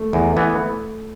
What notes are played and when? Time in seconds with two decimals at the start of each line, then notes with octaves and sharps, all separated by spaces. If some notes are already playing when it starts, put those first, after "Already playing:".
Already playing: A3
0.13 E2
0.37 E3 B3